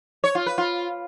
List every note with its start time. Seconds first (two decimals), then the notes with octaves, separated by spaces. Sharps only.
0.24 C#5
0.35 F4
0.46 B4
0.58 F4